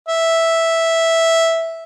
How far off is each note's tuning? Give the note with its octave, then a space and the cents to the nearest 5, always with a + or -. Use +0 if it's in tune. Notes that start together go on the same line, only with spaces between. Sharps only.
E5 -5